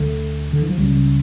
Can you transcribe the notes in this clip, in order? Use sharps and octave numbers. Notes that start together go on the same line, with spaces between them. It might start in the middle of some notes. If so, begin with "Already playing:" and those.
Already playing: D2 D3 A3
D3
E3
F3
C#2 C#3 G3